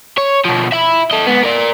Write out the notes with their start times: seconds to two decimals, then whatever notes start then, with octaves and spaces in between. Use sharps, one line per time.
0.17 C#5
0.45 B2 F3
0.72 E5 B5
1.11 A4 D#5
1.27 G#2 B3
1.44 A#4 D5